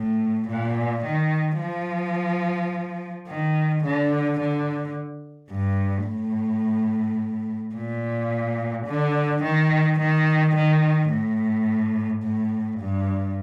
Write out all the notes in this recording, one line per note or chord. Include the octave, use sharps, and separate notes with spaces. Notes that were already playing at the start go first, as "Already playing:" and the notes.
Already playing: A2
A#2
D#3
F3
D#3
D3
D3
G2
A2
A#2
D3
D#3
D#3
D#3
A2
A2
G2